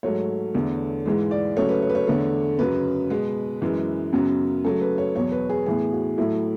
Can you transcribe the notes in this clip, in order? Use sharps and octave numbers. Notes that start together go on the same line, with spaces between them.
G#2 F#3 A3 C#5
E2 D3 A3
G#2 E3 G#3
D5
C#3 F#3 A3 C#5
B4
C#5
B4
C#5
E2 D3 A3
F#2 C#3 F#3 B4
B2 G#3 B3
F#2 E3 G#3
F#2 C#3 F#3 B3
C#3 F#3 A3 A4
B4
C#5
E2 B2 F#3 C#5
B4
G#4
A2 E3 B3 G#4
F#4
A2 F#3 A3 E4